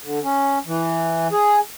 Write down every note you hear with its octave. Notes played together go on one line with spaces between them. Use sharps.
D3
C#4
E3
G#4